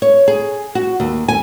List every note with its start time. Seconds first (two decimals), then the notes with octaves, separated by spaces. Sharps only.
0.02 C#5
0.28 G#4
0.75 F#4
1.00 D#2
1.28 G#5